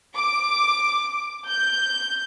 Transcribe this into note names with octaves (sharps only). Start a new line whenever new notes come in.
D6
G6